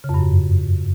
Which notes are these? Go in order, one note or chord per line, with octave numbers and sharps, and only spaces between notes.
C#3
F2
G2
F#2